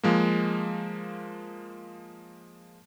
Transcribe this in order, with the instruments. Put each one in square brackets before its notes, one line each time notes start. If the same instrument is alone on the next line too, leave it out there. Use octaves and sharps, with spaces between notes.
[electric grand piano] F3 G#3 A#3